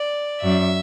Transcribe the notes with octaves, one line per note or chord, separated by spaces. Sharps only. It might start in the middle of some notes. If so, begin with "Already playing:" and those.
Already playing: D5
F#2 E5